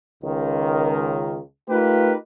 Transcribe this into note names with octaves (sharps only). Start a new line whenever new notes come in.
C#2 D#3
A3 D#4 F4 G4 A#4 B4